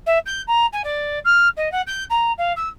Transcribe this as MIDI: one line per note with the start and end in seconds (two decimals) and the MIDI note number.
0.06 0.18 76
0.26 0.42 91
0.47 0.66 82
0.73 0.82 80
0.84 1.19 74
1.25 1.48 89
1.57 1.71 75
1.72 1.82 78
1.87 2.04 91
2.10 2.32 82
2.38 2.53 77
2.56 2.69 88